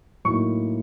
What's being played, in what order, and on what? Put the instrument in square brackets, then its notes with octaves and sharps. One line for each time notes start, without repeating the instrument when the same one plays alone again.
[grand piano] A2 F#3 A#3 D#4 C#6